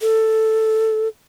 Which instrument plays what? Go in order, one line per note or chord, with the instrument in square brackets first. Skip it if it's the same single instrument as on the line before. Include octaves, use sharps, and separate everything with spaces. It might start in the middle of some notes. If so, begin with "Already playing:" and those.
[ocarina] A4